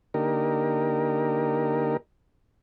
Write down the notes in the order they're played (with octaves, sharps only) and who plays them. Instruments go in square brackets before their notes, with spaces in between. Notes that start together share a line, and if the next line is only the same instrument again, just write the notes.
[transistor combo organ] D3 A#3 D#4 G4 A#4